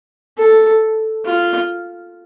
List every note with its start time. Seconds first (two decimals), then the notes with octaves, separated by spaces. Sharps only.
0.38 A4
1.25 F4